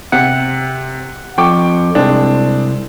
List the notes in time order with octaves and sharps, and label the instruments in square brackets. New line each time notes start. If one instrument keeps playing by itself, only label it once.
[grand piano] C3 [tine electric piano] F#5
[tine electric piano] F2 [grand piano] G5 C#6 D6
[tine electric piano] C2 [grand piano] G#3 C4 D4